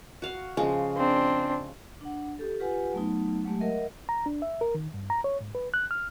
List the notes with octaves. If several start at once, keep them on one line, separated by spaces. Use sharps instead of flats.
F#4 F5
C#3 F3 G#3
C4 D4
D4 F#5
G4 A4
F4 G4 B4 F#5 G#5
F#3 A3 B3 D#4
F#3 G#3 A3 G4
A#4 D#5 E5 F#5
A#5
D4
E5
A#4
D#3
G2
A#5
C#5
G#2
B4
F#6
F6